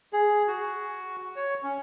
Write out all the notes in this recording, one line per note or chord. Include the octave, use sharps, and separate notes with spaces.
G#4
F#4
C#5
C#4